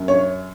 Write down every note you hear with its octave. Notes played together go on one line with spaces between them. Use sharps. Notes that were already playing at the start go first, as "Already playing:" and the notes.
Already playing: F#2
C#5